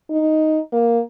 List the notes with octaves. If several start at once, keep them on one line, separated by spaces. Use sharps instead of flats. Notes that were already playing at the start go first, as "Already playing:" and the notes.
D#4
A#3